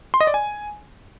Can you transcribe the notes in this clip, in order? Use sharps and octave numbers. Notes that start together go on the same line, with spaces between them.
C6
D#5
D5
G#5